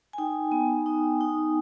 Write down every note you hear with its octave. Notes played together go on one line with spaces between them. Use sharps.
G#5
D#4 G5
B3
D#4
D#4